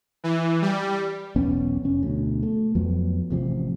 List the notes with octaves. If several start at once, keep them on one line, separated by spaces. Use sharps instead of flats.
E3
G3
E1 B1 B3 C#4
F1 C#4
D2 B2
A3
F2 F3 F#3 B3
A1 C3 F3